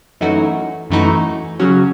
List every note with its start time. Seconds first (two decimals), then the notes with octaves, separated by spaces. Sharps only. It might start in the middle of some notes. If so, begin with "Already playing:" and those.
0.21 F#2 E3 A3 D#4 F#4
0.90 F#2 E3 A3 D#4 F#4
1.60 C#3 F#3 C#4 F#4